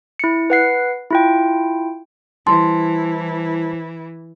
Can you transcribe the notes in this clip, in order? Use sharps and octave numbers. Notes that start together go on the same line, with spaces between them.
E4 C#7
B4 F#5 C7
E4 F4 G5
E3 G3 E4 C5 A5 C6